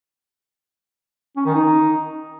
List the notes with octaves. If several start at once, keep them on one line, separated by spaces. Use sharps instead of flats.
C#4
D#3
D#4